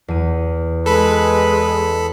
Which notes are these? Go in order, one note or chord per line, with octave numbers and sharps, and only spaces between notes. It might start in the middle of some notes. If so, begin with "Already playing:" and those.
E2 D#7
G#3 A4 B4 B5